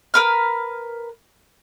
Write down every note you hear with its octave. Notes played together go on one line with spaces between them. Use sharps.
A#4 B4 F6